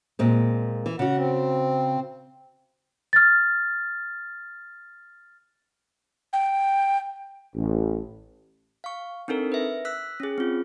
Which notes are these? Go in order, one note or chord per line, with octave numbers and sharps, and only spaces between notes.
A#2 G#3 C4
E3
C#3 F#4 F#5
C4
F6 A6
G5
A1
F5 C#6
C4 D4 D#4 A4 A#4
B4 E5
E6 F#6 B6
C#4 G#4
C4 F4